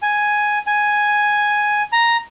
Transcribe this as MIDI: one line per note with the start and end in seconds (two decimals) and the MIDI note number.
0.03 0.59 80
0.67 1.83 80
1.92 2.17 82